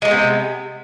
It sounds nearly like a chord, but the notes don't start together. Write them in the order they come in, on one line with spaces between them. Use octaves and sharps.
G#3 A3 B3 C3